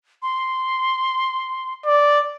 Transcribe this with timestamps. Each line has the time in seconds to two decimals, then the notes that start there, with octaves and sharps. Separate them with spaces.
0.22 C6
1.86 D5